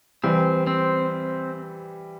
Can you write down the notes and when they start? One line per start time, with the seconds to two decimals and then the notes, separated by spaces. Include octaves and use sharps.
0.24 E3 G3 C4
0.67 C4